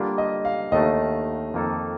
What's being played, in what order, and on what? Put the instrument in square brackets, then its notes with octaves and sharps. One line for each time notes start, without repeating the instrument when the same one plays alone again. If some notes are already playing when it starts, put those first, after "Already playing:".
Already playing: [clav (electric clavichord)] D3 G3 A#3 D4 F4 [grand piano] G4
[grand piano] D#5
F5
[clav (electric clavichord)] D#2 D#3 A3 D4 [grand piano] D#5
[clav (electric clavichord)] F2 D#3 A#3 D#4 A4